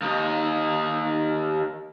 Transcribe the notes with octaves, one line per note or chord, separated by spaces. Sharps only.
D#2 D#4